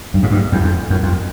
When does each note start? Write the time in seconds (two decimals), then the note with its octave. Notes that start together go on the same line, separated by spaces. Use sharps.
0.14 G2
0.23 G#2
0.31 G2
0.52 E2
0.64 F2
0.90 F#2
1.03 F2